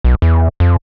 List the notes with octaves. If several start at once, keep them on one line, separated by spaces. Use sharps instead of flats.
B1
E2
F2